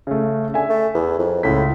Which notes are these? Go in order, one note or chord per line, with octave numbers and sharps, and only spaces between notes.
C#3 A3
D3 E5 G#5
A3
E2
F2
C#2 A2 B6